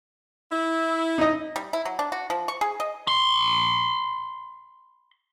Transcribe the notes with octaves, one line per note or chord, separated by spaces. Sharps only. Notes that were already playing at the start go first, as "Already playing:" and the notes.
E4
D#4 D#5
G3
E4
F#3
D4
F#4
F3
C#6
G#4
D#5
B5 C6